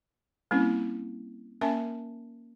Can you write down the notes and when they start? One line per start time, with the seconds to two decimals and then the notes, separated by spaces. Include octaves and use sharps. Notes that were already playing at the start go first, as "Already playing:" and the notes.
0.51 G3 A#3 C4 C#4 E4
1.61 A#3 C#4 A#4 E5 G#5 A5